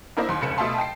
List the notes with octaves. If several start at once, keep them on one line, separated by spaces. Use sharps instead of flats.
A#3 D4 E4 A#4 C5 D#5
D#2 C6
F1 C#2 C#7 E7
B2 A3 E5 F5 A5 C6
G5 A5 C7